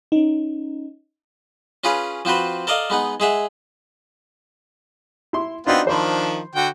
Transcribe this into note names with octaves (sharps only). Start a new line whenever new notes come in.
C#4 D#4
C#4 F4 G#4 B4 C#5
F3 C4 F#4 B4 C5
A4 A#4 D5 D#5 F5
G#3 B3 D#4 F#5
G#3 G#4 E5 F#5
E4 C6
B3 C4 D4 D#4 F4 F#4
D#3 F3 D4 C5 B5 C6
D3 F#4 G5